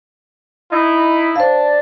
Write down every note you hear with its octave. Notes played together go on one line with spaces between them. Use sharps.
D#4 E4
D4 C5 F5